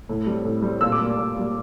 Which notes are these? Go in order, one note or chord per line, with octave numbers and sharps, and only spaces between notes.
A2
G3 C4
A2
G3 C4
A#2 E6
D6
G3 A#3
A#2
G3 A#3